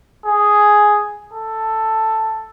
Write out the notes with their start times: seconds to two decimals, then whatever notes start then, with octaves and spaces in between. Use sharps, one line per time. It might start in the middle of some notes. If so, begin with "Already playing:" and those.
0.25 G#4
1.33 A4